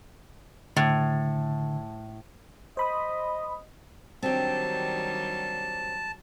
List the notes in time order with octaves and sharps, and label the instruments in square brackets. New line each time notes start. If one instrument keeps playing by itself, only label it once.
[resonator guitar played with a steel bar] A2 [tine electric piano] D3
[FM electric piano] C5 B5 D#6 [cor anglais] D#5
[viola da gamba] D#3 F#3 G3 [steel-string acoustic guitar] C4 D4 G4 [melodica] A5